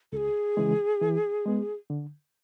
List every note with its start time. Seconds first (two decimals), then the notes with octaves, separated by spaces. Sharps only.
0.12 C#2 G#4 A4
0.57 C#3 E3 G#3
1.01 E3
1.46 G#3 B3
1.90 D3